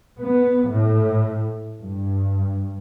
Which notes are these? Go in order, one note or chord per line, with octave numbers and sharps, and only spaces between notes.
B3
A2
G2